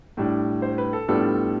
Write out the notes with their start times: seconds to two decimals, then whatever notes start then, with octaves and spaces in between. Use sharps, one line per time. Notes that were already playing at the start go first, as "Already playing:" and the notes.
0.17 A2 G3 D4
0.62 C5
0.78 B4
0.93 A4
1.08 A2 G3 B3 D4 F4 A4